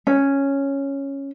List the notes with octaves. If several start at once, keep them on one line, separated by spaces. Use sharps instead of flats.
C#4